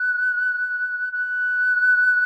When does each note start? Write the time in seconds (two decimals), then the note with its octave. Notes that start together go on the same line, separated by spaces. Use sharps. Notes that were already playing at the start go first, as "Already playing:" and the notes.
Already playing: F#6
1.12 F#6